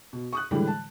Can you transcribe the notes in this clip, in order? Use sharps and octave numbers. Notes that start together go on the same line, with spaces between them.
B2
C#6 D#6 F#6
A2 D3 E3 G3 G#3
A5